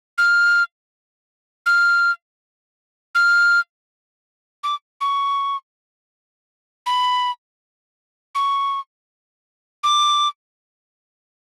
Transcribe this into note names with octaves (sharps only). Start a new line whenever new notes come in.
F6
F6
F6
D6
C#6
B5
C#6
D6